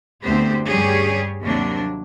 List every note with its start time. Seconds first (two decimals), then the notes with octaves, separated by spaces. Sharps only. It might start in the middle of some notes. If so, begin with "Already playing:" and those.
0.23 D2 B3 C4 G4 C5
0.67 G2 G3 C#4 G4 G#4 C#5
1.41 D#2 C3 F#3 A#3 D4